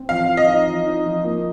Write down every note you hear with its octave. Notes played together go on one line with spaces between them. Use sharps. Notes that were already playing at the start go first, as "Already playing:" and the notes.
Already playing: C4
F3 F5
F3
D#5
D#4
F3
D#4
F3
A#3